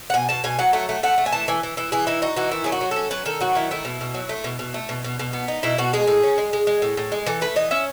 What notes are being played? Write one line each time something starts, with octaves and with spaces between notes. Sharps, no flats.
F#5
B2 G#5
B2 A5
B2 G#5
F#3 F#5
A3 F#5
A3
A3 F#5
A3
G#5
E3 A5
E3 G#5
E3
E3 E4
E3 G#4
D#4 E4
D#4 F#4
E3 F#4
D#3 E4
F#3 G#4
F#4
F#3
C#4 A4
F#3 B4
D#3 A4
F#3 F#4
D#3 E4
A3 E4
B2
B2
F#3
A3
B2
B2
A3
B2
B2
B2
B3
D#4
B2 E4
B2 F#4
G#3 G#4
A2
C#4
G#3
G#3
G#3
A2
A2
G#3
E3 A4
A3 B4
E3 D#5
C#4 E5